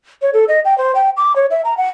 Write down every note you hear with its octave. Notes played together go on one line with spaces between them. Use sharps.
C#5
A4
D#5
G5
C5
G5
D6
C#5
E5
A#5
F#5